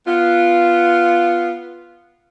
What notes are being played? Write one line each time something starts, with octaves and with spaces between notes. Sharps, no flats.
B3 F4